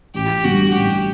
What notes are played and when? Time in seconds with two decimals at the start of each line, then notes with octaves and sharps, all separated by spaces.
0.14 A1 G4
0.43 G2 D3 G3 F#4
0.73 A1 G4